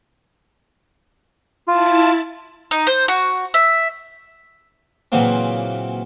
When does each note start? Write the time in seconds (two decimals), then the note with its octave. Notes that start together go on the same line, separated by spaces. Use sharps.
1.68 E4 F4 A5
2.71 D#4
2.87 C5
3.08 F#4
3.54 E5
5.12 A#2 C#3 E3 F#3 A#3 C4